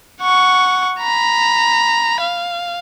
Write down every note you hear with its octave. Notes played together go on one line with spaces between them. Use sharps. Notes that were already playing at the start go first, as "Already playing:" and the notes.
F#5 C#6
A#5 B5
F5